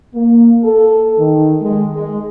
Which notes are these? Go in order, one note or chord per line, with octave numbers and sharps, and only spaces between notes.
A#3
A4
D#3
G#3
G#3